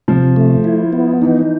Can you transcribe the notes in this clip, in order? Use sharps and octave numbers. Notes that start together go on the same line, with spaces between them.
C3 F3
A3
E4
B3
E3 D#4